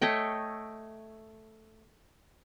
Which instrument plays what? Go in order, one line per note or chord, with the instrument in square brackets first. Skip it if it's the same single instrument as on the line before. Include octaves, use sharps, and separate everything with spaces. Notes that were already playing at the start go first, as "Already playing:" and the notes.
[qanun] A3 C#5 D#5 G5